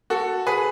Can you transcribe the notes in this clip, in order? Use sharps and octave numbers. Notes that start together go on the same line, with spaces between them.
F#4 A4
G#4 B4